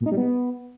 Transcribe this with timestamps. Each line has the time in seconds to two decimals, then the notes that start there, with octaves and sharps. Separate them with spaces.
0.01 A#2
0.06 D#4
0.12 G3
0.17 B3